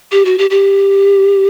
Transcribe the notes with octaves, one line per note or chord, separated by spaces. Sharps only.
G4
F#4
G4
G4